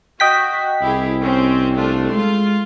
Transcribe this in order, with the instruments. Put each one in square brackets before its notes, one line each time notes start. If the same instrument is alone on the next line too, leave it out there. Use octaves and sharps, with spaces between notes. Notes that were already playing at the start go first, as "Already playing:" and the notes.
[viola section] F#4 [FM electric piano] D#5 G5 B6
[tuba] C2 [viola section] E4 G4 G#4
[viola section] C4 C#4
A3 D4 F4
[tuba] G#3 [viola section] F4 C6